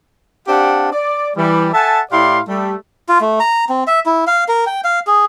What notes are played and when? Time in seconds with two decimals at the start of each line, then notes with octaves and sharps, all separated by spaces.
0.48 C4 D4 G4 F5 F#5 A5
0.93 D5
1.36 E3 G3
1.74 A4 E5 F#5 G#5 A5
2.11 A2 E4 G4 D5 F5 C6
2.48 G3 A3
3.09 F4
3.21 A3
3.40 A#5
3.69 C4
3.87 E5
4.06 E4
4.27 F5
4.48 A#4
4.67 G5
4.84 F5
5.07 G#4